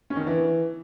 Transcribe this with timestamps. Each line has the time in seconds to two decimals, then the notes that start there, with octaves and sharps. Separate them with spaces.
0.10 C#4
0.16 D#3
0.21 D3
0.27 E3